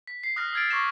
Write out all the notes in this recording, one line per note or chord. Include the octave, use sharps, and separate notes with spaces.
B6
C7
D#6 F6 F#6 A#6
E6 F6 G#6 A6 D7
C#6 D6 G#6 A#6 E7